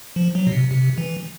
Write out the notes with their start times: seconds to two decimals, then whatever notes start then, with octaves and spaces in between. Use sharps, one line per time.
0.16 F3
0.35 F#3
0.47 B2
0.52 C3
0.71 C3
0.98 E3